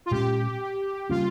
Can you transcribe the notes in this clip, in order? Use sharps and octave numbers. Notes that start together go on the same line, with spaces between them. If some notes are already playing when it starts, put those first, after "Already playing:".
F4
A#2 G#3 C#4 G4
C#3 G3 A#3 C#4 F4